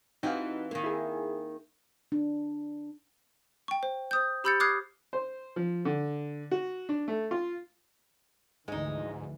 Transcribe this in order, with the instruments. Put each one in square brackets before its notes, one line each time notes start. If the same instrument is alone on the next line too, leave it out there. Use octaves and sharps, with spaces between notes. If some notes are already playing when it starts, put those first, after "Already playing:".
[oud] E3 C4 G4 [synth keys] D#4 F#4 F5
[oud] D#3 A#3
[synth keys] E4 G#4
[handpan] D4
[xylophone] G5 C#6
C5
C5 D#6 G6
G4 B5 E6 G6 A6 C#7
D6 D#6 F6 F#6 G#6 C7
[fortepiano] C5
F3
D3
F#4
D4
A3
F4
[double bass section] D2 E3 F3 [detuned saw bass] G#2 [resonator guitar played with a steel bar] G#3 D#4